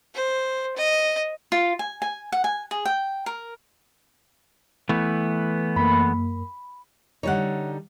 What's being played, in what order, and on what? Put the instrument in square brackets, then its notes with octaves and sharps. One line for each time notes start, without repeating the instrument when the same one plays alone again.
[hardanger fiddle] C5
D#5
[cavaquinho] F4
G#5
G#5
F#5
G#5
G#4
G5
A#4
[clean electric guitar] E3 A3 B3
[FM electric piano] F#2 A#3 [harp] B5
[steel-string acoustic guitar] D3 G3 D#4 [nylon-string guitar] C#5 F#5